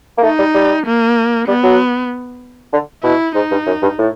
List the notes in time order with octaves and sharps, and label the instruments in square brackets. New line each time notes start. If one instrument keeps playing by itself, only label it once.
[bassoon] A#3
[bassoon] A3 [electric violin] D#4
[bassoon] G3
G3
[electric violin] A#3
[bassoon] G3 [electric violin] B3
[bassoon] F#3
D3
[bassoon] B2 [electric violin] E4
[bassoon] G#2 [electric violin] D#4
[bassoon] G2
F#2
G2
A2